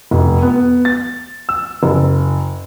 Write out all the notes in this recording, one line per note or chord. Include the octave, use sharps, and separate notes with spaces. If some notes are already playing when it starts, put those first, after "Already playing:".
F1
B3
A6
E6
F#1